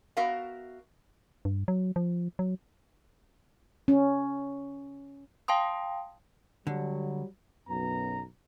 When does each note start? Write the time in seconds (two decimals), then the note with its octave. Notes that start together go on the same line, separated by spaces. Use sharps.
0.17 B3 F#4 A#4 E5 F5
1.45 G2
1.68 F#3
1.96 F3
2.39 F#3
3.88 C#4
5.48 F5 G5 A5 C6 D#6
6.67 D3 F#3 G3
7.68 B1 F#2 B3 A#5